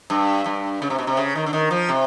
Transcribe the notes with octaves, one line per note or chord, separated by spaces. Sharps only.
G2
G2
C#3
C3
B2
C3
C#3
D#3
D3
D#3
F3
C3